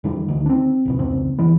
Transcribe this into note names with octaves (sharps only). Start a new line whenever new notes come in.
E2 D#3 G3
D2 D#3
C4 D4
A#1 D#2 B2
F1 C#2 C4
D#2 E3 B3